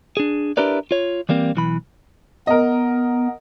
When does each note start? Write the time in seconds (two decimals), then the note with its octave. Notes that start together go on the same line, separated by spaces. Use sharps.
0.17 D4 G#4
0.57 D4 E4 G4 A#4 B4 D5
0.91 F4 C#5
1.29 E3 G3 A#3 C4
1.55 B1 E3 B5
2.47 B3 A#4 D#5